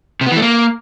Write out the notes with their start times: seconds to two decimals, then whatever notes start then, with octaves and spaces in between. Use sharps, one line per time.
0.21 C3
0.26 B3
0.32 E3
0.37 A3
0.42 A#3